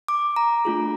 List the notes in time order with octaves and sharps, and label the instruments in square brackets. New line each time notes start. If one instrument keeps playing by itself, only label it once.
[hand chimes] D6
A#5
A3 D4 F4 G#4